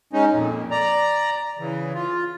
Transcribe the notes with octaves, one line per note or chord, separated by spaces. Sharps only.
G#3 C#4 D#4
F2 A#2
D5 A#5
C#3 E3
F4